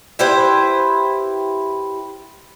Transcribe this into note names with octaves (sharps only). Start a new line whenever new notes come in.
E4 G4 B4 C5